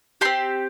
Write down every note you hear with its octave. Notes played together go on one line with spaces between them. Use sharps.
C4 G4 C6